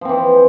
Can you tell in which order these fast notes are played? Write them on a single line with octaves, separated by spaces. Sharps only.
F3 C4 E3